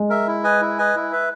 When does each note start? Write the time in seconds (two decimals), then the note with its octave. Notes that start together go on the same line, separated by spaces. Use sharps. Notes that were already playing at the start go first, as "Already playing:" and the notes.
Already playing: G#3
0.10 A#4 E5
0.27 E4
0.44 B4 D#5 G#5
0.61 E4
0.78 B4 D#5 G#5
0.95 E4
1.12 B4 E5